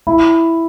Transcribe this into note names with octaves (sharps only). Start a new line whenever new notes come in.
E4